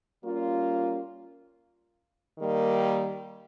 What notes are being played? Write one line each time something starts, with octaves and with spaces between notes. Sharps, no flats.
G3 A#3 C#4 F4
D#3 G3 A#3